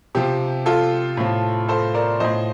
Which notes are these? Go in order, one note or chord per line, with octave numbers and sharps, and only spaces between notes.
C3 F3 G4
F4 A4
A2 F3
A4 C5
A#4 D5
A2 F3 C5 D#5